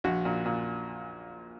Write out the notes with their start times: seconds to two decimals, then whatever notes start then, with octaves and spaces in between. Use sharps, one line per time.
0.04 A#1 F#4
0.25 A#2
0.45 A#2